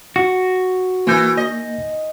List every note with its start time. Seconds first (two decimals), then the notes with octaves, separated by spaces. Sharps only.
0.16 F#4
1.07 E3 A#3 G6
1.37 D#5